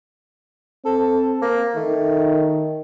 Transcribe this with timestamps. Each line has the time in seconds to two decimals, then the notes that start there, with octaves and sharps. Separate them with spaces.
0.85 C4 A4
1.42 A#3
1.76 D#3 A3